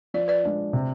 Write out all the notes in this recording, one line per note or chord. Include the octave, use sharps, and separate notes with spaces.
F3 D5
B4 D5
G#3 D4 F4
C3